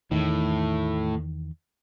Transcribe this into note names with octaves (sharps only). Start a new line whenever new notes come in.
E2 A2 D#3